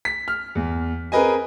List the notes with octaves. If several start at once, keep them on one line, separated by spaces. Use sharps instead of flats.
B6
F6
E2
C4 G#4 A#4 B4 D#5 G#5